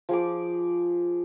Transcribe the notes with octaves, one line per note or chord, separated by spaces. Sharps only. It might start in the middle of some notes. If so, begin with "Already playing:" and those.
F3 G#4 D6